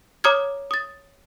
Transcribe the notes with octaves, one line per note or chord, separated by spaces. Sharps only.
C#5 A#5 D6 D#6 F6 G#6
D#6 A6